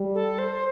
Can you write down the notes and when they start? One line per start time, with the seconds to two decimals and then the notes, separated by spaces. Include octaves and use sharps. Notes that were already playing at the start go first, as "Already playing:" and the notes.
Already playing: G3
0.14 A4
0.38 C5